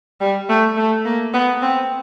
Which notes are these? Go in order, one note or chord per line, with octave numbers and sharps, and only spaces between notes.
G3
A3
A3
A#3
B3
C4